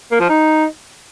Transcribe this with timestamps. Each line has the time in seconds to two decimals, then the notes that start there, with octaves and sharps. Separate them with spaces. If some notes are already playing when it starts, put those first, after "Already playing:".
0.11 A#3
0.20 F3
0.29 D#4